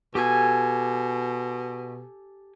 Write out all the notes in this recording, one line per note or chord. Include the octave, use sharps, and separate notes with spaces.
B2 G4 A4 G#5